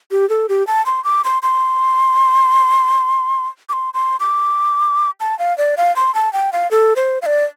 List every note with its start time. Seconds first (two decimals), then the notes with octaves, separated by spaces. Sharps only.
0.11 G4
0.30 A4
0.49 G4
0.67 A5
0.86 C6
1.04 D6
1.24 C6
1.43 C6
3.69 D6
3.73 C6
3.94 C6
4.20 D6
5.20 A5
5.39 F5
5.58 D5
5.77 F5
5.96 C6
6.15 A5
6.33 G5
6.53 F5
6.71 A4
6.96 C5
7.22 F5
7.26 D5